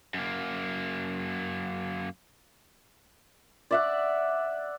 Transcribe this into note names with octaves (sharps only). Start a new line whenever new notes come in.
F#2 A#3
D5 E5 F#5